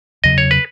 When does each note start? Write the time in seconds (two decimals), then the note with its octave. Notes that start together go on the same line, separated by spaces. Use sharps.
0.24 E2 C#3 F#3 D#5
0.38 C#5
0.51 B4